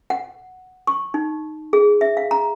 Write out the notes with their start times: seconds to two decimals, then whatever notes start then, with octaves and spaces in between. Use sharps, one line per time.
0.10 F#5
0.87 C#6
1.14 D#4
1.73 G#4
2.01 E5
2.17 F5
2.31 A#5